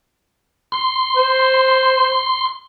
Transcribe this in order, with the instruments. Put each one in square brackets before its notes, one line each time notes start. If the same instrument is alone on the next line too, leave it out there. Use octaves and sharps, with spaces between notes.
[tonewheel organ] C6
[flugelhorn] C5